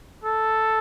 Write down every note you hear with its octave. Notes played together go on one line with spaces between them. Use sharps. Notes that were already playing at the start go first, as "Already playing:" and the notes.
A4